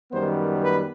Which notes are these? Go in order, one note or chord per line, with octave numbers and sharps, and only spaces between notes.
F#2 D#3 G3 B3 C5
B4